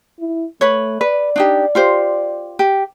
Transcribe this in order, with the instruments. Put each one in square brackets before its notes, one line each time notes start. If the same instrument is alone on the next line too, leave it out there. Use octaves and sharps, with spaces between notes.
[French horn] E4
[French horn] A3 [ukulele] B4 C#5
[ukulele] B4 [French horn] D5
[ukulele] D4 D#4 G4
F4 G4 C5
G4